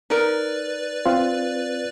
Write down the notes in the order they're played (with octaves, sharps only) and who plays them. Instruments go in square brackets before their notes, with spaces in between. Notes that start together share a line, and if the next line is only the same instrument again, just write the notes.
[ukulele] D#4 A#4 [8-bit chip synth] B4 D5
[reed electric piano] C4 F4